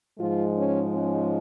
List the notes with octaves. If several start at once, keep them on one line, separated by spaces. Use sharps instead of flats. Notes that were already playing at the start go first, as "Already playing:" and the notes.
G#2 F3 G#3 F4
C#4
C#4